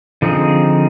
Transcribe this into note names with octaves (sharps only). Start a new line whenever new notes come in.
D3 F3 C4 D#4 G#4